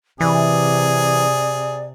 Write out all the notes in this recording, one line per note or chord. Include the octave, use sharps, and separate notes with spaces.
C3 E3 G#4 D5